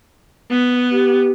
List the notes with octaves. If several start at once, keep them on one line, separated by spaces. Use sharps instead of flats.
B3
G4